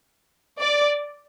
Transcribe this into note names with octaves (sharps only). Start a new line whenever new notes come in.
D5